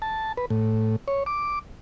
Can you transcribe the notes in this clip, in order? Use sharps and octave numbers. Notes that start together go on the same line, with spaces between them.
A5
B4
A2
C#5
D6